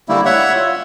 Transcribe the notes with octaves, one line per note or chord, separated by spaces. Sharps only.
D3 G3 A3 A#3 E4
C#5 E5 F#5
F4